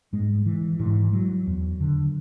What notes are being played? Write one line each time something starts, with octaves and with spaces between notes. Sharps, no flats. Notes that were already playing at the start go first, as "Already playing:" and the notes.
G#2 G#3
E3
G#2 E3
F#3
E2
D3